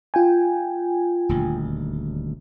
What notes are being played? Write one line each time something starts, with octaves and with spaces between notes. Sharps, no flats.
F4 G5 G#5
D#1 D2